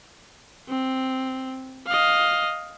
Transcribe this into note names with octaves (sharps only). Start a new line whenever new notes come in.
C4
D#5 F5